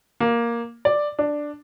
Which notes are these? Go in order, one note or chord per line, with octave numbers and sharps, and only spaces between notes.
A#3
D5
D4